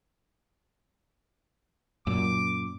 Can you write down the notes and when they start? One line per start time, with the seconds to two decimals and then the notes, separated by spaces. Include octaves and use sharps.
2.07 F#2 A#2 D6